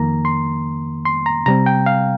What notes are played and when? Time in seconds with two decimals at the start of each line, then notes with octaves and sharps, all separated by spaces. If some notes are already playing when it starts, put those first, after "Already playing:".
Already playing: F2 D#3 A#3 A#5
0.25 C6
1.05 C6
1.26 A#5
1.46 C3 G3 C4 A#5
1.66 G5
1.86 F5